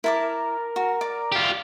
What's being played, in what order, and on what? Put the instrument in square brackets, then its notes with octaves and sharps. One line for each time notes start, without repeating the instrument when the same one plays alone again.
[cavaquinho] E4 A5 D6 [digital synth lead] A#4
[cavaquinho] F#4
D5 D6
[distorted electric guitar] F4 G4